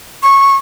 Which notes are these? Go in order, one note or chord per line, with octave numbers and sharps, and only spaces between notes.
C#6